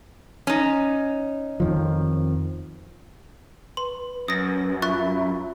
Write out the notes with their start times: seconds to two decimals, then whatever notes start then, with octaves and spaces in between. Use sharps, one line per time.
0.47 C#4 D#4
1.60 F2 D#3 F3
3.77 B4 C6
4.28 F#2 D#6 A#6
4.82 F4 E5 B5 C#6 F#6 A6